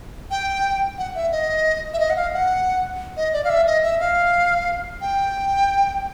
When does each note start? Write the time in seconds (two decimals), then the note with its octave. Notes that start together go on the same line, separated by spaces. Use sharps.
0.31 G5
0.98 F#5
1.15 E5
1.32 D#5
1.93 E5
2.00 D#5
2.10 F#5
2.16 F5
2.33 F#5
3.17 D#5
3.33 D5
3.44 F5
3.50 E5
3.66 D#5
3.84 E5
4.00 F5
5.01 G5